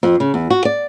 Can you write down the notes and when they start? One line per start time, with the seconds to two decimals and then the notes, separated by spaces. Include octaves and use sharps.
0.03 F2
0.20 C#3
0.34 E2
0.50 F#4
0.65 D5